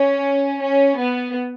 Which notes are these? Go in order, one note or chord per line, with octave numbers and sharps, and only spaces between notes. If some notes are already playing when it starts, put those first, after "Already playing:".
Already playing: C#4
C#4
B3